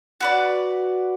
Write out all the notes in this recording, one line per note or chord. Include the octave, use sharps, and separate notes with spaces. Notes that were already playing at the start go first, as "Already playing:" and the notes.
F#4 B4 D5